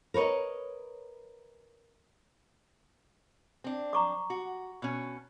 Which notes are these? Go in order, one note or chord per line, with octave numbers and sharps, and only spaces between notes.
A#4 B4 C#5 D#5
C4 D4
A#5 C#6 D6
F#4
B2 C#4